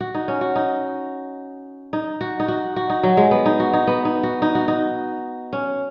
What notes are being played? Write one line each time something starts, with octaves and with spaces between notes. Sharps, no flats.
F#4
D#4
C#4
F#4
D#4
D#4
F#4
D#4
F#4
F#4
D#4
F#3
G#3
B3
D#4
F#4
D#4
B3
D#4
F#4
D#4
F#4
D#4
C#4